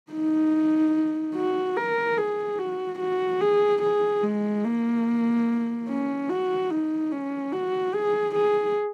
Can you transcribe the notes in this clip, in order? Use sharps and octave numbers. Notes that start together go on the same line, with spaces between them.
D#4
F#4
A#4
G#4
F#4
F#4
G#4
G#4
G#3
A#3
C#4
F#4
D#4
C#4
F#4
G#4
G#4